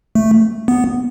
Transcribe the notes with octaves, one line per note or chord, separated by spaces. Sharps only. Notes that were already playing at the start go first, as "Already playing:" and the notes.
A3
B3